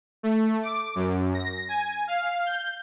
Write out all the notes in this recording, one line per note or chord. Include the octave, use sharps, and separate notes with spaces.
A3
D6
F#2
A#6
G#5
F5
G6